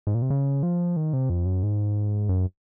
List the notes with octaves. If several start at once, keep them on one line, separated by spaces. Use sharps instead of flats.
G#2
A#2
C3
C#3
F3
D#3
C3
F2
F#2
G#2
F#2